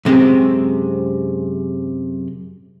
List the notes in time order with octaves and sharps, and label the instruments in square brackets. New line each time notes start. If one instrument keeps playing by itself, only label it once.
[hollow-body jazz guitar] F#2 C3 G#3 C4 C#4